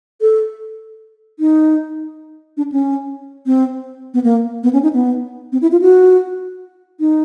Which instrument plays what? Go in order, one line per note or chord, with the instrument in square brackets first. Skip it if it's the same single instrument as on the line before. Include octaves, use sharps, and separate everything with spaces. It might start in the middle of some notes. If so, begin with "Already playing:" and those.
[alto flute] A4
D#4
D4
C#4
C4
B3
A#3
B3
C#4
D#4
B3
C4
E4
F4
F#4
D#4